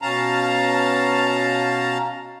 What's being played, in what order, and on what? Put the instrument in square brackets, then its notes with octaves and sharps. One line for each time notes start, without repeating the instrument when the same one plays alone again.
[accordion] B2 C#4 F5 A5 A#5